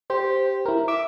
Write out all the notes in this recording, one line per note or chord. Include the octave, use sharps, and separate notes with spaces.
G4 C5
E4 A#4
E5 D6